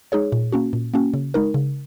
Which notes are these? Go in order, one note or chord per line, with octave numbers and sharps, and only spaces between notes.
G#3 D#4 G#4 C#5
A#2
A#3 C#4 F#4
A#2
A#3 C#4 F#4
C#3
G#3 D#4 A#4
C#3